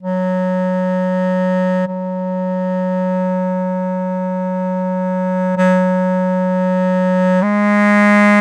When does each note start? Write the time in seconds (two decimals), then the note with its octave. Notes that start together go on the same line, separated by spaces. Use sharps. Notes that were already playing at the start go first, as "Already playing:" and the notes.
0.02 F#3
1.87 F#3
5.57 F#3
7.42 G#3